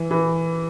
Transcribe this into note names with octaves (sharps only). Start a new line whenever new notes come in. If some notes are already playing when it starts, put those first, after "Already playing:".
Already playing: E3
E3